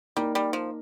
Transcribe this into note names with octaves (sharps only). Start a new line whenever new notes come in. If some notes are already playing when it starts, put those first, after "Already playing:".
G3 A#3 D#4 A#4 D5
G3
F3